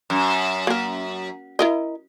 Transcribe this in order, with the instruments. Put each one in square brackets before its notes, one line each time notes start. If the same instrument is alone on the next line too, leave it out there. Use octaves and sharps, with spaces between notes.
[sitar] F#2
[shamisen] A#3 A#4
E4 A#4 D#5